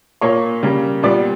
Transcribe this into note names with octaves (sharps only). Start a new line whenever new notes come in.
A#2 A#3 C#5
C#3 G3 A#3
A#2 G3 B3 D5